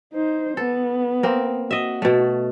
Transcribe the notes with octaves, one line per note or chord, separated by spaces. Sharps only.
D#4 C5
B3 A4
A#3 C4
F#4 D#5 E5
B2 A3